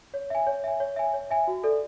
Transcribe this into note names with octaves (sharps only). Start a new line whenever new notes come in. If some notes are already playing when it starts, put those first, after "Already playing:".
C#5
E5 G#5
C#5
E5 G#5
C#5
E5 G#5
C#5
E5 G#5
F#4
A4 D5